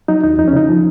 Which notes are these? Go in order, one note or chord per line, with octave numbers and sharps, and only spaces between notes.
F#3 D#4
D#2 D#4
F2 D#4
C#4
C#3 D#4
F3